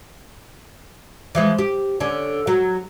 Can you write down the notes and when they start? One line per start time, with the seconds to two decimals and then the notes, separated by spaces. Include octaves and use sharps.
1.35 E3 F3 G#3
1.58 G4
2.00 D3 C#4
2.47 F#3